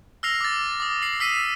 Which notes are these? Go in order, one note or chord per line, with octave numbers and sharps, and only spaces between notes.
E6 F6 A#6 C7 F7
D6 A6
D6 D#6
C7 F#7
E6 B6 C7 D#7